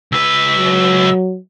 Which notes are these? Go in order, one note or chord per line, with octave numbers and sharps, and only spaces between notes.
C#2 B4 E6
F#3